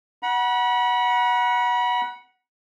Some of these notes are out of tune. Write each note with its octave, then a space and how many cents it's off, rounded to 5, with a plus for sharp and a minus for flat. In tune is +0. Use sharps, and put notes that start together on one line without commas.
F#5 +0 B5 -40